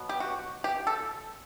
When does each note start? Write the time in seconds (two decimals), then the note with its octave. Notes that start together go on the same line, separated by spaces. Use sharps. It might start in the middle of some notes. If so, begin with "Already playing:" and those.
Already playing: B2 F#3 B3
0.09 G4
0.20 F#4
0.64 G4
0.87 A4